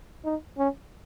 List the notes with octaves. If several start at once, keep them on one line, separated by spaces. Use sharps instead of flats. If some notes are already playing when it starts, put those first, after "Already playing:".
D#4
C#4